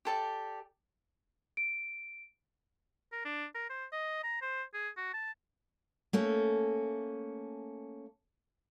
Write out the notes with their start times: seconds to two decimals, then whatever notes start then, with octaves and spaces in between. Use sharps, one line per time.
0.05 G4 A4 D5
1.57 D7
3.12 A#4
3.25 D4
3.55 A#4
3.70 C5
3.93 D#5
4.24 A#5
4.42 C5
4.74 G#4
4.97 F#4
5.14 A5
6.13 A3 A#3 C#4